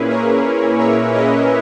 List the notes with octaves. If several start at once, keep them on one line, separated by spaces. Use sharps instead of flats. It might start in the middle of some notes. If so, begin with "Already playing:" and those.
Already playing: A#2 A#3 C#4 E4 G#4 B4
A#4 C#5
C#5 E5
B4 D#5